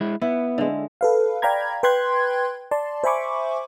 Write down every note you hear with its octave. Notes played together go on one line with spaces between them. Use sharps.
G#3 E4
B3 E4
D3 G#3
A4 B4 F5
D5 F5 G5 A#5 B5 G#6
B4 G5 B5 C6 F#6 G#6
D5 A5 C6
C5 E5 G#5 B5 C#6 D6